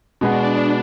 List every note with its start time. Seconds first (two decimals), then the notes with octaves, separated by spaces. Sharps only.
0.21 B2 G#3 B3 D4 F#4